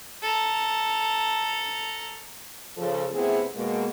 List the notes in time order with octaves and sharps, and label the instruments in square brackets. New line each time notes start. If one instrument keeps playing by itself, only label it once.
[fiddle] A4 A#5
[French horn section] C#3 F3 A4
C3 A3 B3 C4 E4 G#4
B2 G#3 A#3